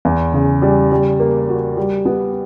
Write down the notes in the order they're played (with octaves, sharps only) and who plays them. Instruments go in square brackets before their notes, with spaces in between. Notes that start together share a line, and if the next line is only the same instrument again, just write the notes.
[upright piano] E2
C#3
G3
G3
A#3
F#4
G3
B3